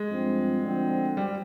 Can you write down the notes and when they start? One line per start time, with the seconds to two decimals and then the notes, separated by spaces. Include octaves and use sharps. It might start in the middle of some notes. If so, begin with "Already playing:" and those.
Already playing: G#3
0.08 G2 F3 C4
0.62 D2 D3 F3 C4
1.17 G3